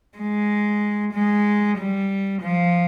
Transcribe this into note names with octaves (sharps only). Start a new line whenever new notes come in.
G#3
G#3
G3
F3